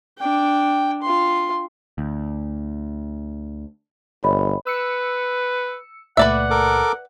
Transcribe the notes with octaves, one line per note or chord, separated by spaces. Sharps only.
D4 G5
F4 C6
D2
G1 C#5 D#5 B5
B4 E6 C#7
C#2 A#2 A3 B4 D5 E5 F#5
A4 A#4 D6